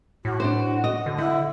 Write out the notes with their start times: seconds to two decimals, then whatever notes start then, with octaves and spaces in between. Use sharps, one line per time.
0.25 A2 F#4
0.40 D4 C5
0.84 D#5
1.06 D3
1.18 D3 E4 F#5